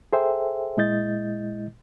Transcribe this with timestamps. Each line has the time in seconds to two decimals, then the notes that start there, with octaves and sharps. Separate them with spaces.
0.13 G#4 A4 C5 E5 G5
0.77 A#2 G#3 E4 D#5 G6 A6